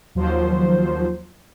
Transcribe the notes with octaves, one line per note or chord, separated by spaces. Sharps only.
D#2 F3 F#3 C5